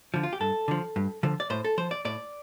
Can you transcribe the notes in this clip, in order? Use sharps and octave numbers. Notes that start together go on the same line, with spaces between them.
D3 F3
F4
G4
G2 A4
D3 F3
G2
D3 F3
D5
A2 C5
A4
F3 C5
D5
A2 D5